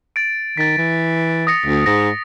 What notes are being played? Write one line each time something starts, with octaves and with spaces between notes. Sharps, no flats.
A6 D7
D#3 A6 B6
E3
D#6 A#6 C#7
D2
G#2 A#6